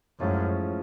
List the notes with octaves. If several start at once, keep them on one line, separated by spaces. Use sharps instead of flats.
F#2 A2 F3 G#3 C#4 F4